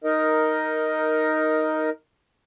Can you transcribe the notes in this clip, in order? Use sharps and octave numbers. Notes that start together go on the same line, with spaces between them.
D#4 A#4 D#5